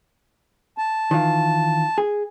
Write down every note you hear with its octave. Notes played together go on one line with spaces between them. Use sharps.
A5
D#3 E3 F4
G#4